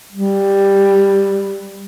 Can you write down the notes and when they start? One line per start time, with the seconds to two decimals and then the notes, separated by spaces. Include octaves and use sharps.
0.13 G3